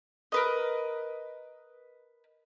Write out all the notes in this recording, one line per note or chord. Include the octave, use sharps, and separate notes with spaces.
A#4 B4 D#5